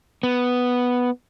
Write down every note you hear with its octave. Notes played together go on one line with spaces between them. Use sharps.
B3